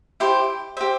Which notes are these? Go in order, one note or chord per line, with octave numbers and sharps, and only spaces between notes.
E4 G4 C5
G4 C5 E5